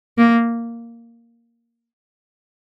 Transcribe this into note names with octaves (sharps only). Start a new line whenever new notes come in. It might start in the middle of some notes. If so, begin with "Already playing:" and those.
A#3